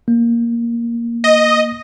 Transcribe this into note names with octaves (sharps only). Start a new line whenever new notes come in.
A#3
D#5